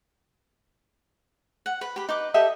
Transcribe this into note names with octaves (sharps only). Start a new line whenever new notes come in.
F#5
B4 B5
G4 B5
D#4 B4 D6
G4 A4 D#5 E5